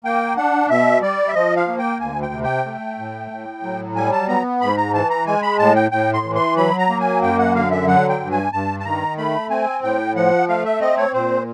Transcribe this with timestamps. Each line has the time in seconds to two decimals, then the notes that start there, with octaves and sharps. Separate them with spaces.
0.04 A#3 G5
0.37 D4 F#5
0.70 B2 E5
1.02 G3 D5
1.29 E5
1.35 F3 D#5
1.56 F5
1.68 A#3
1.78 G5
2.00 D2 G#5
2.22 G5
2.33 C3
2.44 G5
2.66 A3
2.98 A2
3.31 A2
3.63 F#3
3.96 G3 G#5
4.12 A5
4.28 B3 A#5
4.61 G#2 B5
4.77 A#5
4.94 E3 A5
5.10 A#5
5.26 G#3 G#5
5.42 B5
5.59 A2 A5
5.75 G5
5.91 A2 G5
6.14 C6
6.25 E3
6.35 C6
6.57 F#3 B5
6.79 A#5
6.89 A#3
7.00 G#5
7.22 F#2 G5
7.39 F#5
7.55 D3 F5
7.71 E5
7.87 F#3 F#5
8.09 G5
8.20 G2
8.31 G#5
8.52 G2 A5
8.80 A5
8.85 D#3 A#5
9.18 A3 B5
9.50 C4 G#5
9.83 A2 G5
10.16 F3 F#5
10.48 A3 F5
10.65 E5
10.81 C4 D#5
10.97 C#5
11.14 A#2 C5